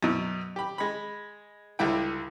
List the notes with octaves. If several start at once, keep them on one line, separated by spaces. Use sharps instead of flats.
F#2 B2
G4 B5
G#3 B5
C#2 D3 G3 E4 G5